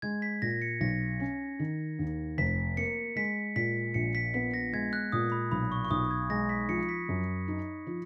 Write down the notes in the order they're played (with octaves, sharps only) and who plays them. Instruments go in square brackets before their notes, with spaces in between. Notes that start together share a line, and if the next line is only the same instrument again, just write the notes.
[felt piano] G#3 [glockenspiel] G#6
[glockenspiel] B6
[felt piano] A#2 [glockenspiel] A#6
[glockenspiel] C#7
[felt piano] B1 [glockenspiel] A#6
[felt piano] C#4
D#3
D#2
[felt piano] F1 [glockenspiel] B6
[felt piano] A#3 [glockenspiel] C#7
[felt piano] G#3 [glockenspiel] B6
[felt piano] A#2 [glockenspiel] B6
[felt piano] A#1 [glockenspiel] C#7
[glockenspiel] B6
[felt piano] B3 [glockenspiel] B6
[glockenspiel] A#6
[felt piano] G#3 [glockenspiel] G#6
[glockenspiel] F#6
[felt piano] A#2 [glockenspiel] D#6
[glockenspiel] B5
[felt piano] B1 [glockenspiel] B5
[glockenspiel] C#6
C#6
[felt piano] B1 [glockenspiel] D#6
[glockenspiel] G#6
[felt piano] G#3 [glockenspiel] A#6
[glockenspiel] B6
[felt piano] F3 [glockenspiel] C#7
[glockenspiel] B6
[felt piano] F#2
D#4
F3